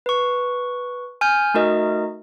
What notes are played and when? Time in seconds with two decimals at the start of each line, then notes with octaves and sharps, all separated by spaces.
0.06 B4 C#6
1.21 G#5 F6 G6
1.54 A3 D#4 F#4 A#4 D#5